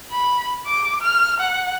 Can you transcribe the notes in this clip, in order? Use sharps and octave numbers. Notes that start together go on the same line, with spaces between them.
B5
D6
F6
F#5